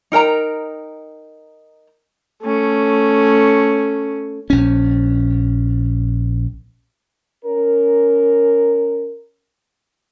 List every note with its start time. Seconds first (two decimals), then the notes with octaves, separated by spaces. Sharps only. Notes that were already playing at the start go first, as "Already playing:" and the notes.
0.12 D#4 A#4 G5 A#5
2.43 A3 C#4
4.50 A#1 C#4
7.45 C#4 A#4